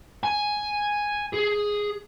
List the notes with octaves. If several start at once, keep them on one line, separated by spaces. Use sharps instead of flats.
G#5
G#4